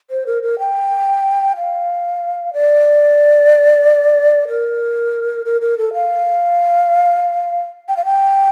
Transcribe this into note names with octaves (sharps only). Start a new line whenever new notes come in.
C5
A#4
A#4
G5
F5
D5
A#4
A#4
A#4
A4
F5
G5
F5
G5